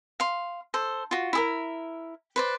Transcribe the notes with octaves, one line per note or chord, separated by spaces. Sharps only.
F5 C6
A4 C5
F4 F#4
E4 G#4 A#4
B4 C5 D5